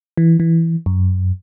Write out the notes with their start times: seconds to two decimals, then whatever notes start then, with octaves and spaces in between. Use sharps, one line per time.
0.17 E3
0.40 E3
0.86 F#2